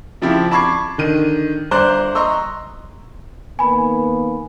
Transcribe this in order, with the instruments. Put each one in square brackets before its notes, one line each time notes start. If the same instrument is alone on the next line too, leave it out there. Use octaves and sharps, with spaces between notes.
[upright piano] C#3 F3 C4 E4 G4
A5 B5 C#6 D6 G#6 C7
D3 D#3 D#7
G1 C5 D5 A#5 C6 F#6
D#5 A#5 C6 C#6 E6
[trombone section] D#3 A#3 B3 [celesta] G#5 B5